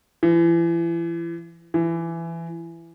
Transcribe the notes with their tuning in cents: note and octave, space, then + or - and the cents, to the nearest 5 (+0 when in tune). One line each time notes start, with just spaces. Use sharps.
E3 +35
E3 +20